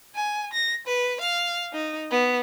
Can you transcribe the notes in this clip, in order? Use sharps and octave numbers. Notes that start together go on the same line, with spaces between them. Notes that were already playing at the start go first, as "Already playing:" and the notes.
G#5
A#6
B4
F5
D#4
B3